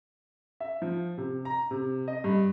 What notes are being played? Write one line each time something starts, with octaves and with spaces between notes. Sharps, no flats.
E5
F3
C3
A#5
C3
D#5
G2